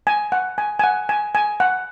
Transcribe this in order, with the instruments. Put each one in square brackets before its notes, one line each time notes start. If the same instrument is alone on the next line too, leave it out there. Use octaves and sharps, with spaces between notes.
[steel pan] G#5
F#5
G#5
G#5
F#5
G#5
G#5
F#5